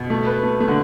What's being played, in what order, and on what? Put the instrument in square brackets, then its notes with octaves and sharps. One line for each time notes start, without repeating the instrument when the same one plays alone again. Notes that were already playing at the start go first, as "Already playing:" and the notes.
Already playing: [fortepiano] B2
[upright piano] A3
B4
A3
A3
[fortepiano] D3